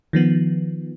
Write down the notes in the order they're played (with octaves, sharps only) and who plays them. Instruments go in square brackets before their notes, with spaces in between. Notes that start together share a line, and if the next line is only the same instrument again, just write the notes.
[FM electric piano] D#3 F3 B3